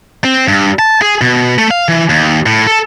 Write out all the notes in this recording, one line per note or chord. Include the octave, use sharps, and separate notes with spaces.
C4
G2
A5
G#4
B2
A3
F5
E3
D#2
A2
A4